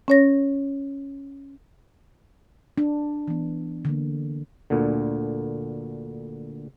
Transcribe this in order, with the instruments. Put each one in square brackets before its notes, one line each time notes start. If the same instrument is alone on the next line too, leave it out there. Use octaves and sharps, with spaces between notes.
[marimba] C#4 C#5 A#6
[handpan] D4
E3 B3
D3 A#3
[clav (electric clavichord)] D2 A#2 D3